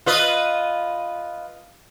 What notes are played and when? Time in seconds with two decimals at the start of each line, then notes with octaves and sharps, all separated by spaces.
0.06 F4 B4 D#5